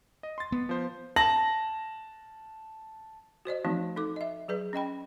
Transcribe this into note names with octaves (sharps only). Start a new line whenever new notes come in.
D#5
C6 A6
B3
F3 C5
A5 A#6 F#7
F#4 C5 D5 D#5
E3 F3 A3 C4 D#4 F#4
D#4 A4 D6
D#5 E5
F#3 G#4 B4 D5
C#4 D#5 G5 B5